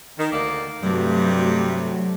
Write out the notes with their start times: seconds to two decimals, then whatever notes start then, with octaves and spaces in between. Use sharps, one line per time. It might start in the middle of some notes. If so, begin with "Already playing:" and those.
0.19 D#3
0.33 D2 A#3 D5
0.83 G2 C3 F#3 A3